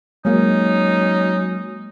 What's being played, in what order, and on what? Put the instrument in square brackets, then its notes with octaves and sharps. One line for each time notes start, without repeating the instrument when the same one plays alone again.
[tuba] F#3 [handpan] G#3 A#3 [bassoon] C#4 [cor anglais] D#4